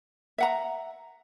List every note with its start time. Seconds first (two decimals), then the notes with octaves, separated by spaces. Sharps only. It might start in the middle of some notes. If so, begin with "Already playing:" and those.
0.38 E5 F#5 A#5